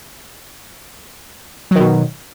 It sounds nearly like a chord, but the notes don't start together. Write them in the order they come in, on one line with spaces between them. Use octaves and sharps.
F#3 D#3 B2